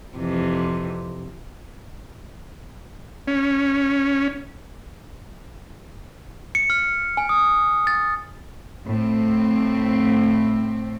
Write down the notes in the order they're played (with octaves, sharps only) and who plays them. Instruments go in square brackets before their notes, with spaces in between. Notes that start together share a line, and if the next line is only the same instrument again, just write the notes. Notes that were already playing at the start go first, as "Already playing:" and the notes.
[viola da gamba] F2 C3 E3
[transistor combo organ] C#4
[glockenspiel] C#7
F6
G#5
D#6
A6
[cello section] A2 C4